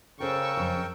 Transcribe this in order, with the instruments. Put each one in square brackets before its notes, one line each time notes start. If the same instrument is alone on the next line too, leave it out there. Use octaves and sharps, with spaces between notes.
[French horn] C#3 [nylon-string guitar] A4 C5 [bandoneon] A#4 G5 [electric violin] C#6 E6
[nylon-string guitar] F2 C5